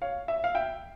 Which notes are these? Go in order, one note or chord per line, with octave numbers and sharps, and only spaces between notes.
C#5 F5
E5
F5
E5 G5